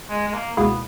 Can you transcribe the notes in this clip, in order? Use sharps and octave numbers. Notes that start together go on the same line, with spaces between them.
G#3
G#3
A#3
C#2 B2 A#3 B3 E4 G#4